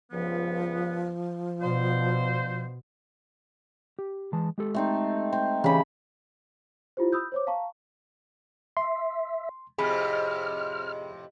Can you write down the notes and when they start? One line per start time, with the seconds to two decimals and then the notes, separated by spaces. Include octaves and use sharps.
0.12 C#2 G2 F3 B3
1.62 B2 D4 F4 C5
3.99 G4
4.33 E3 G#3 A5
4.58 G#3 G4 A4
4.74 A3 C4 D#4
5.33 C4
5.64 C#3 E3 G4 B5
6.97 E4 F4 G4 C5
7.12 B5 D#6 E6 G6
7.32 C5 C#5 D6
7.47 F5 A5 A#5 C#6
8.77 E5 C6
9.78 F2 A2 C3 G#4 B5 F6